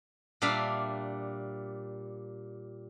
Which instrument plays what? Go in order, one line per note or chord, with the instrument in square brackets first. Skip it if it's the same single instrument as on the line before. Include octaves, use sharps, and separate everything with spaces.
[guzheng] A#2 G3 D4 E5 F5